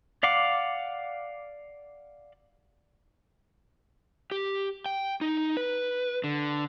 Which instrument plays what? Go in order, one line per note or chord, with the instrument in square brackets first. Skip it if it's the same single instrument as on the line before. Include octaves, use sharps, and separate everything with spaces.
[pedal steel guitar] D5 F5 F#5 D6
[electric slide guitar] G4
G5
D#4
B4
D3